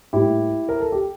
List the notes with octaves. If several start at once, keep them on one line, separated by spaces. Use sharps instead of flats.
A2 G3 A#3 E4 G4
A#4
A4
G4